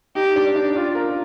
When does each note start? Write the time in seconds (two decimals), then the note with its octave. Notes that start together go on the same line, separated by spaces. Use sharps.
0.15 D#4 G4
0.36 D4
0.56 D4
0.76 F4
0.95 A#4